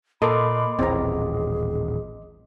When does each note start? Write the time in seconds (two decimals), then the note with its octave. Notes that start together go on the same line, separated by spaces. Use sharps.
0.22 A#2 A4 A#4 D#5 B5 C6 D6
0.79 D#1 A1 C4 E4 G#4 A#5